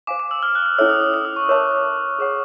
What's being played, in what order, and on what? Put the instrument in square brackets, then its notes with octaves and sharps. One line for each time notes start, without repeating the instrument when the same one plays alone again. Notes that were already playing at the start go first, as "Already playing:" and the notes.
[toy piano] C5 F5 G#5 [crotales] D6
[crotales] D6
E6
F6
F#6
F6
[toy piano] C#4 E4 A4 C#5 E5 [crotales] E6
[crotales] D#6
D#6
E6
D#6
C#6
[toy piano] A#4 C#5 E5 A5 [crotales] D6
[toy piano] G#4 C#5 F#5 [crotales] D6